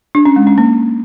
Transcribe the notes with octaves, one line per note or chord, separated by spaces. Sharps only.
D4
C#4
G#3
C#4
A#3